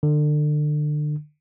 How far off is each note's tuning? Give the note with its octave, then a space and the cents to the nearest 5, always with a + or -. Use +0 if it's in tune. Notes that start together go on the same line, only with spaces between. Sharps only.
D3 +30